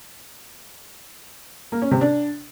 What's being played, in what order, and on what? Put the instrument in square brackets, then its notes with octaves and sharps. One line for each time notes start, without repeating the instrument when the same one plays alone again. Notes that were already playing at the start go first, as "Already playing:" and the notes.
[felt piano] A#3
C#4
C3
D4